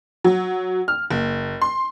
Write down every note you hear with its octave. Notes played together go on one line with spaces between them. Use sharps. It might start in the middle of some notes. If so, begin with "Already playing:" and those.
F#3
F6
F#1
C6